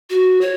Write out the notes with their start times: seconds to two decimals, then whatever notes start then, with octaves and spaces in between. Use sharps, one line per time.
0.10 F#4
0.41 C#5